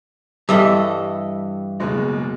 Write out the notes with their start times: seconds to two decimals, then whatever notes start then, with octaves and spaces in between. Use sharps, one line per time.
0.49 G2 E3 G3 A4 D#5 E5
1.80 F#1 B2 G#3